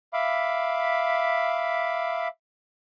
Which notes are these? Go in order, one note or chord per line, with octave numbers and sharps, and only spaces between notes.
E5 F5 B5 D6